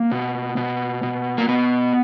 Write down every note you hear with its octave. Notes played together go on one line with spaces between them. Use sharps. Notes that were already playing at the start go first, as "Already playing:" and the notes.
Already playing: A#3
B2
B2
B2
A#3
B2 B3